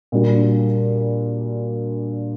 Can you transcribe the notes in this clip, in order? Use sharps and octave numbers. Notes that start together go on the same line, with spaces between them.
A#2 G3 D4 F#4